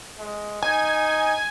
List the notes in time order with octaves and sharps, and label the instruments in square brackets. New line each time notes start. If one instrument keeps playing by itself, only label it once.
[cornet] G#3
[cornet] D#4 [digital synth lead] G#5